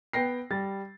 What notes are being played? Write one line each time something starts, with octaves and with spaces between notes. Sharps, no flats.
B3 G5 A#6 C7
G3 A6